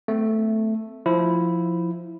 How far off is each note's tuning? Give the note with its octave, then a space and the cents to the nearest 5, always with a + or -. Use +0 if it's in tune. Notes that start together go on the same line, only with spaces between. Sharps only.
A3 +0 C4 -40
F3 +0 E4 +0